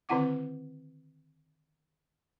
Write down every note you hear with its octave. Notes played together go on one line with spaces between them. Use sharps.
D3 D#3 C4 E4 F#5 D6